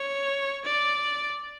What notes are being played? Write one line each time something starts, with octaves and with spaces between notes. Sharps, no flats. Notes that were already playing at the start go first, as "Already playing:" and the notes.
Already playing: C#5
D5